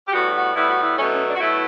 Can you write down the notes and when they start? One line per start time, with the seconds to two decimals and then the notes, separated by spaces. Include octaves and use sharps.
0.08 G4
0.13 A2 G3 B3 F#4
0.34 F#4
0.55 A2 G3 B3 E4
0.67 F#4
0.80 E4
0.97 B2 F#3 A3 C#4
1.11 C#4
1.25 D4
1.35 F#4
1.40 B2 F#3 A3 E4